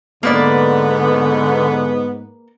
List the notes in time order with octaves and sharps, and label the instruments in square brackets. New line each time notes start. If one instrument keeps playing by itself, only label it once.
[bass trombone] G#2 [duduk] D3 [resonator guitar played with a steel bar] A#3 B4 D5 [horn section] B3